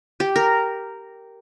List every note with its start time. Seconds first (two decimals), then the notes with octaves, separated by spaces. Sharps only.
0.20 G4
0.36 A#4